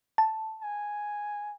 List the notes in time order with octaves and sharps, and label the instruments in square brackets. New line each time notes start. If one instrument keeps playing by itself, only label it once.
[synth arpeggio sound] A5
[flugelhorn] G#5